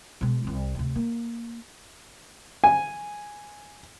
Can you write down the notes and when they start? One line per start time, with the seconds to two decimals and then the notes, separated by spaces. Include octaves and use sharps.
0.21 B2 G#3
0.44 C2 C4
0.75 D2 C3
0.96 A#3
2.64 G#5